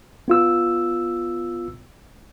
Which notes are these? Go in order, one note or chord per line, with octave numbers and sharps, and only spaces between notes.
B3 F4 E6